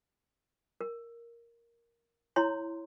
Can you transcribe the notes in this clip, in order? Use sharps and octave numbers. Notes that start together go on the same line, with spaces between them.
A#4
E4 C#5 A#5 C6